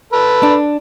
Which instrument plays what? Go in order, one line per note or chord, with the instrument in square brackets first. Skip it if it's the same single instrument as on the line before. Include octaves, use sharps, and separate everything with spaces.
[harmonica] A4 B4
[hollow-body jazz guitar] D4